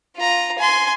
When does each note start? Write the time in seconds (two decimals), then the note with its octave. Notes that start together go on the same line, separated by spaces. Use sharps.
0.17 F4 A#5
0.58 G#5 C6